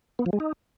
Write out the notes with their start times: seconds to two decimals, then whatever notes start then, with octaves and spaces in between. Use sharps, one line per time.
0.19 B3
0.26 F3
0.33 G#3
0.40 D#4